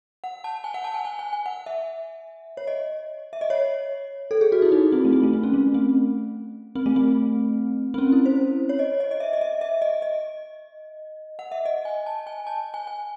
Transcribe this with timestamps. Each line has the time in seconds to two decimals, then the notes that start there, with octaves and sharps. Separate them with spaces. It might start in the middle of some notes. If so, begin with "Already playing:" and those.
0.24 F#5
0.44 A5
0.64 G#5
0.74 F#5
0.84 A5
0.94 G#5
1.05 G#5
1.19 G#5
1.33 G#5
1.46 F#5
1.66 E5
2.57 C#5
2.67 D#5
3.33 E5
3.41 D#5
3.50 C#5
4.31 A4
4.41 G#4
4.52 F#4
4.62 E4
4.72 D#4
4.92 C4
5.05 A3
5.13 C4
5.23 A3
5.33 C4
5.43 C#4
5.54 A3
5.74 C4
6.75 C4
6.86 A3
6.96 C4
7.94 C4
7.98 C#4
8.12 E4
8.26 C5
8.69 C#5
8.79 D#5
9.00 D#5
9.11 D#5
9.20 E5
9.33 D#5
9.41 E5
9.61 E5
9.82 D#5
10.02 D#5
11.39 F#5
11.51 E5
11.65 D#5
11.85 G#5
12.06 A5
12.27 G#5
12.47 A5
12.74 G#5
12.87 G#5